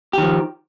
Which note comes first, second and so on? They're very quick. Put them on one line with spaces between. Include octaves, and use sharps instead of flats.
G4 D#3 F3